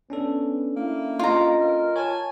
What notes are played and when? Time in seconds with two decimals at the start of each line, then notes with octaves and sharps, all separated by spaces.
0.10 B3 C#4 D4 A4
0.76 A#3 E4
1.19 F4 D#5 A#5
1.61 A#4
1.96 C#5 G#5 A5